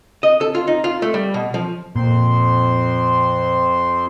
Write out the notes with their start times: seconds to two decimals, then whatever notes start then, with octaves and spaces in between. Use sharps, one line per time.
0.23 D#5
0.41 A4
0.55 F4
0.68 D#4
0.84 F4
1.02 A3
1.14 G3
1.34 B2
1.54 F3
1.96 F2 A#2 C4 C6